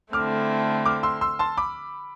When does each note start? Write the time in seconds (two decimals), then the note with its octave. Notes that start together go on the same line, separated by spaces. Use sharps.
0.13 D3 A3 C4 E4 D6 F6
0.86 D6 F6
1.03 C6 E6
1.21 C6 E6
1.39 A5 C6
1.57 B5 D6